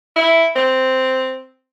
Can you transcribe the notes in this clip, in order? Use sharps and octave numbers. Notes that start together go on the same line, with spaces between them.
E4
C4